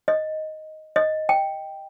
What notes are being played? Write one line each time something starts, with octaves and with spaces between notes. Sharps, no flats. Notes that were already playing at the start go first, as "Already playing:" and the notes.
D#5
D#5
G5